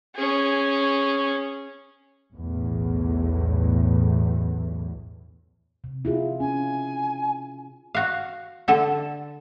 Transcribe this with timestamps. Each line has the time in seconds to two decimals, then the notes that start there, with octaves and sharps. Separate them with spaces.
0.16 C#4 G#4
2.35 B1 E2 A2
5.84 C3
6.05 E4 F4 G#4
6.40 C#4 G#5
7.95 F#4 F5
8.68 D3 A4 E5 F#5 A5
8.86 D5